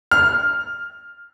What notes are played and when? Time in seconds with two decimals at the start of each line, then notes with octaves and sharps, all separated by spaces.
0.11 F6